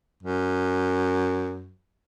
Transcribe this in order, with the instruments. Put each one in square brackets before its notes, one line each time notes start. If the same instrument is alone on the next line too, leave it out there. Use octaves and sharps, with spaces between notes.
[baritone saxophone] F#2